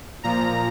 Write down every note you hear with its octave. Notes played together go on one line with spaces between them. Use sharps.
A#2 F3 A#5